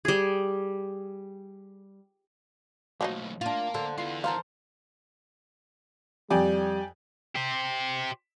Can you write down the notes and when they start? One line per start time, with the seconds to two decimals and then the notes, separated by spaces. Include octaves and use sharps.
0.05 G3 G#4
3.01 B1 A2 F3 F#3 D#4
3.41 A#3 D4 F4
3.74 D3 A4 C5
3.98 E3 B3 F4 C6
4.24 A4 A#4 C5 F5
6.30 F2 G3 G4 D5 G#5
7.35 G4 C5